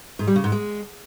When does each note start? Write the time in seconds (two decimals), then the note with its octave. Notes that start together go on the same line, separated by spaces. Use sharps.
0.19 G#2
0.27 G3
0.36 C#3
0.44 G#2
0.52 G#3